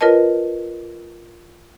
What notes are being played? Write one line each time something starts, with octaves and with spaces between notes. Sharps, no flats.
F4 A#4 B4 C#5 D#5 A5